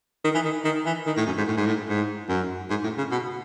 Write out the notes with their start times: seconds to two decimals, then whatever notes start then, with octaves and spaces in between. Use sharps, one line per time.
0.25 D#3
0.34 E3
0.45 D#3
0.65 D#3
0.86 E3
1.06 D#3
1.17 A2
1.27 F#2
1.38 G#2
1.48 A2
1.57 G#2
1.66 A2
1.89 G#2
2.29 F#2
2.70 G#2
2.84 A2
2.98 C#3
3.11 B2